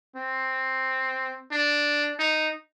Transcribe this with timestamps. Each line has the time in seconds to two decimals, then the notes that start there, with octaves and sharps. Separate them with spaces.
0.16 C4
1.52 D4
2.19 D#4